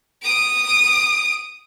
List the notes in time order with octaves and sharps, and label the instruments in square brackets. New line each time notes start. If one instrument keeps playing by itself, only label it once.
[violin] D#6 D7